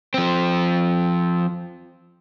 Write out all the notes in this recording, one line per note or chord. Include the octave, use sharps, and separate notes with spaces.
F3 C4